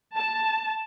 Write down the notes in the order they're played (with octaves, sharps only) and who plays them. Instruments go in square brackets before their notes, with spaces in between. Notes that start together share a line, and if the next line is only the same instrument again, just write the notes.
[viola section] A5